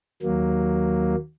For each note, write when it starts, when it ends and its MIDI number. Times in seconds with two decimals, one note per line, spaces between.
0.22 1.15 39
0.22 1.15 54
0.22 1.15 58